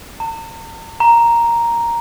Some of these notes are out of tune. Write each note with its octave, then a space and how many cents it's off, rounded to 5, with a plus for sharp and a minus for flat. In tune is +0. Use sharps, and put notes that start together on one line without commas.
A#5 -45
A#5 +0